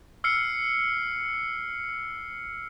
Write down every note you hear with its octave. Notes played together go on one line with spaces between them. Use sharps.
E6 F6 C7 C#7